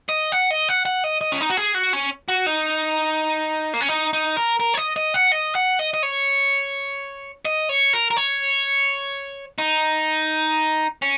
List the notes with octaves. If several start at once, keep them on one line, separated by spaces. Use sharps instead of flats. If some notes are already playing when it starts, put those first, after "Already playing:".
D#5
F#5
D#5
F#5
F#5
D#5
D#5
C#4
D#4
F#4
G#4
F#4
C#4
F#4
D#4
A#3
C#4
D#4
D#4
A#4
A#4
C#5
D#5
D#5
F#5
D#5
F#5
D#5
D#5
C#5
D#5
C#5
A#4
A#4
C#5
D#4
C#4